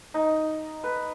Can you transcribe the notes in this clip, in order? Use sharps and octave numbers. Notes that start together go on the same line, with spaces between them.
D#4
B4